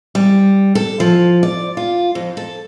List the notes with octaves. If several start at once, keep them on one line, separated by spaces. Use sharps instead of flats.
G3
A4
F3
D5
F4
F2
A4